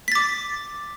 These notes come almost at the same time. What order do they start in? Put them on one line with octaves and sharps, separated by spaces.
B6 A6 D6